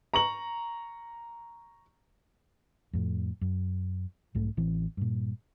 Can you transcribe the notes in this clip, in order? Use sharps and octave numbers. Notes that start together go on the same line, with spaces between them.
A#5 C#6 F#7
F2 A2
F#2
B1 G#2 A3
A1 E3 C4
G2 A#2